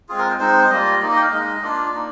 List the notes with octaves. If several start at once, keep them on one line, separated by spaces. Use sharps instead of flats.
G#3 C4 F4 G#4
A#4
C5
G#3 C4 D#4 C5
G3 A#3 F4 D#5
A#3 D#4 D5
D#5
G5
F5
G#3 D#4 D#5
A#3 D4 F4 D5
A#3 D#4